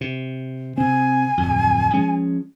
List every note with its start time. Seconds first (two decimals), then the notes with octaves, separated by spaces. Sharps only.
0.01 C3
0.78 C3 C4 G#5
1.37 D1 F2
1.94 F3 G#3 C#4